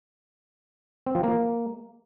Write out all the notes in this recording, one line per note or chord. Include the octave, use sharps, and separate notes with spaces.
C4
F3
A#3